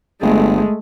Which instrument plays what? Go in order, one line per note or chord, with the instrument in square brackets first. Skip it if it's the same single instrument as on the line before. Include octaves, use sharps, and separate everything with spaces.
[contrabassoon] G1 [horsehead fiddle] G#3 A3